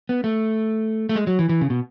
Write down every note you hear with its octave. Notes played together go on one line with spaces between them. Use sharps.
B3
A3
A3
G#3
F#3
E3
E3
C#3
B2